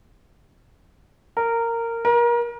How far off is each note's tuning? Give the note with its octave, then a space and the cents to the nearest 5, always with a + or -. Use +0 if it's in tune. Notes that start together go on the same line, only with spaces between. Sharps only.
A#4 -15
A#4 +30